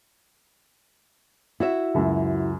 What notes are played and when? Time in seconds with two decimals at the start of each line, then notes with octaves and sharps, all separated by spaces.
1.60 E4 F#4 E5
1.94 C#2 F#2